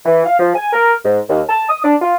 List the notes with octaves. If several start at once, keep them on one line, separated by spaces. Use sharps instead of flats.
E3
F5
F3
G#5
A#4
G#2
D#2
A5
D#6
D4
F4